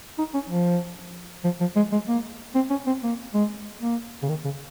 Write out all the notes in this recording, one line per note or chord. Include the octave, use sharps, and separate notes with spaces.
D#4
C#4
F3
F3
F3
G#3
G#3
A#3
C4
C#4
C4
A#3
G#3
A#3
C#3
D#3
C#3